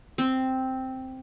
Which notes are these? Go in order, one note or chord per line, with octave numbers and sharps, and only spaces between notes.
C4